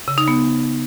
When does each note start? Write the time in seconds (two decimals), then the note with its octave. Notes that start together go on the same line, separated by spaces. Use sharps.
0.08 C#3
0.18 D#4
0.28 B3